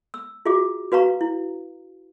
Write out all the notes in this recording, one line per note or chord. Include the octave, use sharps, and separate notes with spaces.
E6
F4 F#4 G#4 E5 D6
F#4 B4 F5 A#5 C#6
E4